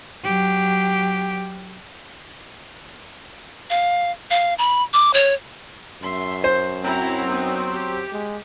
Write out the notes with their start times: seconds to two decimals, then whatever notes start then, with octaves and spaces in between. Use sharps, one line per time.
0.24 F#3 G4
3.70 F5
4.31 F5
4.58 B5
4.93 D6
5.14 C#5
6.02 F#2 E5 C6
6.44 C5
6.84 F#3 C4 E4 A#5
7.28 B3 D#4
7.72 G4
8.13 G#3